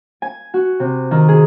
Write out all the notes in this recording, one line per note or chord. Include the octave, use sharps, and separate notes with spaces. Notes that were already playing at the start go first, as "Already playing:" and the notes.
G#5
F#4
C3
D#3
G#4